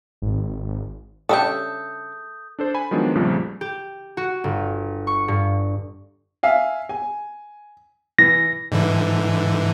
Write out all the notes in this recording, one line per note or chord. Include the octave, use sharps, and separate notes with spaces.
G#1
C#3 G3 D4 A4 E5 D#6 G6
D4 A4 C5
G#5 B5
D#3 F3 F#3 G#3 B3 D4
A#1 F2 C#3 F3 G3 A3
G4
F#4
G1
C#6
G2
E5 F5 G#5
G#5
E3 A#6
G#2 D3 E3